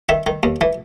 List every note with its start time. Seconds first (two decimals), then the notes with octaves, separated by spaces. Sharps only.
0.09 D#3 E5
0.27 D#3
0.43 D#2
0.61 E3